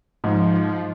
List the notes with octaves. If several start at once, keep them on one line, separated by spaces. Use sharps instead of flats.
G#2 F3